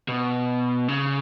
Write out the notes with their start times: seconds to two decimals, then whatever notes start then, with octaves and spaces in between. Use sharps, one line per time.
0.09 B2
0.89 C#3